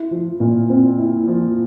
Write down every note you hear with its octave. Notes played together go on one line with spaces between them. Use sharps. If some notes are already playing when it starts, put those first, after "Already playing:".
Already playing: E4
F3
A#2
C4
E4
F3